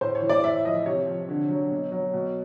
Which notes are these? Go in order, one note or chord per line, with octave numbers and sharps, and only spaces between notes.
A2 C5
C#5
E3
D5
A2 E5
F3 D#5
C3 C#5
F3
D3
F#3
B2
F#3
B2